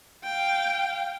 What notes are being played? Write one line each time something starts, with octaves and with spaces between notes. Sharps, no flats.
F5 G5